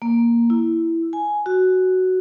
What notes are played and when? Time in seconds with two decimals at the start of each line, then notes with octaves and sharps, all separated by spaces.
0.02 A#3
0.50 E4
1.13 G#5
1.46 F#4